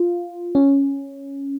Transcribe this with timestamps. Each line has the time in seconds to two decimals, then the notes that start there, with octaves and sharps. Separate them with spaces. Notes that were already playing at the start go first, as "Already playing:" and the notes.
Already playing: F4
0.55 C#4